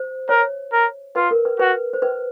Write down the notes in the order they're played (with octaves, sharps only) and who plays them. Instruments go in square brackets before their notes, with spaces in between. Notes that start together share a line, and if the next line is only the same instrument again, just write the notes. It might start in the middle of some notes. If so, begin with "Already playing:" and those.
Already playing: [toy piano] C5
[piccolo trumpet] A#4 [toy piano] C#5
[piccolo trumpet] A#4
[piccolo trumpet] F4 [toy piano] B4
[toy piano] A#4
B4
[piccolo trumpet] F#4 [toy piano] B4
[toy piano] C5
B4